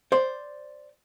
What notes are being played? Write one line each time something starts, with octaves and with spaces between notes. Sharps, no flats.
C5 D5